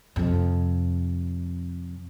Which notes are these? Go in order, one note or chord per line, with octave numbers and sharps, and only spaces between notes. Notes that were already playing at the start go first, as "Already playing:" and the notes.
F2 C3